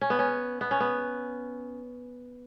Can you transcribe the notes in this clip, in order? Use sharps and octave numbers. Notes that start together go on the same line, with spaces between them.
C#4
B3
C#4
B3
C#4
B3